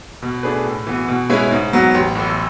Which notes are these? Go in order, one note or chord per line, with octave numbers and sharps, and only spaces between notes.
B2
A3 D4 G#4 B4
A2
E3 B3 F#4
B2
G#3 C#4 E4 B4
G#2
F#3 B3 F#4
A1
A2 E3